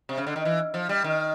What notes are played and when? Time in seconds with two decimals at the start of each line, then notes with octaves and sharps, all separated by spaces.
0.09 C3
0.17 C#3
0.27 D3
0.36 D#3
0.45 E3
0.74 F3
0.89 G3
1.04 D#3